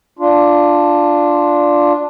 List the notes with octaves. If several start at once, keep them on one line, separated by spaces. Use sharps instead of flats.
D4 F4